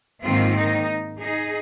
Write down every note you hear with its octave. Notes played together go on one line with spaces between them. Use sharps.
G#2 D#3 A#3 C4 F4
D#4
D#4 G#4